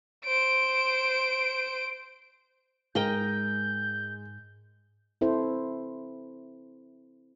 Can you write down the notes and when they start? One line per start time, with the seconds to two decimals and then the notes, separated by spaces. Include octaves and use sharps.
0.25 C5 D7
2.95 G#2 G#3 A#4 D#5 G5 G6
5.21 C4 E4 A4 C5